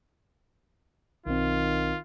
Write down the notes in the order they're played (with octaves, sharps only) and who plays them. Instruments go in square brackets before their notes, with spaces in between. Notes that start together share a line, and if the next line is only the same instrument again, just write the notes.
[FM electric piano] B1 C4 [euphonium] D#3 [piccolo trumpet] F4